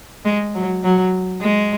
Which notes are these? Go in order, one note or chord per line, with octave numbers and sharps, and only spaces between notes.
G#3
F#3
F#3
G#3